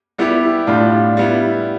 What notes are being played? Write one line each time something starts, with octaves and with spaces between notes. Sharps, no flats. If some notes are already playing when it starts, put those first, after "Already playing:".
G3 B3 E4 G4
A2 G3 D4 F4
G3 B3 E4